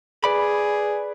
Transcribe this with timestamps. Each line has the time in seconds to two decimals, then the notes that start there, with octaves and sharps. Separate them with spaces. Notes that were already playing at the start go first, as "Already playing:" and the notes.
0.24 G#4 B4 D5 B5